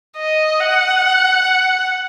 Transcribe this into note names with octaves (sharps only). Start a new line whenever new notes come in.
D#5
F#5